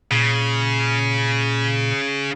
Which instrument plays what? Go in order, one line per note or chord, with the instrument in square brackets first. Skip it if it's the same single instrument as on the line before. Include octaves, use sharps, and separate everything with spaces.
[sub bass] A#2 [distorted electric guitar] C#3